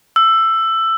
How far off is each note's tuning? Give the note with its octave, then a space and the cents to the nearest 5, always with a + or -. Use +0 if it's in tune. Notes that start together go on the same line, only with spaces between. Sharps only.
E6 +15